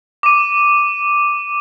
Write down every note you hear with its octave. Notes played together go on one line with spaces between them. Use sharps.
D6 D#7